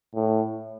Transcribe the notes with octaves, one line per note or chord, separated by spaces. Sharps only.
A2